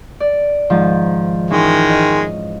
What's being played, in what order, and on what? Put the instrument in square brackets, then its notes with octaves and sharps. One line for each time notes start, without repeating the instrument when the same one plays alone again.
[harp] D5
G#2 D#3 F3
[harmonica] D#3 G#3 [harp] E3 C4 C#4
[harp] D#5